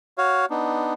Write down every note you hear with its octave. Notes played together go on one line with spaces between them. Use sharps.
F#4 C#5 F5
B3 D4 D#4